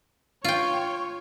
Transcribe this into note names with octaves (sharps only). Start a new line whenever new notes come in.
F4 C#5 G5